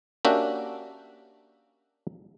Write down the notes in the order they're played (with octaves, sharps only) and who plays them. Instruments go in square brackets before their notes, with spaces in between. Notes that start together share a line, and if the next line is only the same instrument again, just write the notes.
[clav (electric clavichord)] A#3 C#4 D4 F#4 G4 E5